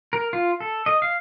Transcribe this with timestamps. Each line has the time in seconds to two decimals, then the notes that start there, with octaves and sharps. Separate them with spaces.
0.13 A#4
0.33 F4
0.60 A4
0.86 D#5
1.02 F5